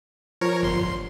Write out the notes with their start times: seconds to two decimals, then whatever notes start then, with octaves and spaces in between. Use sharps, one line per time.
0.41 F3 A#4 C#5
0.62 G1 C6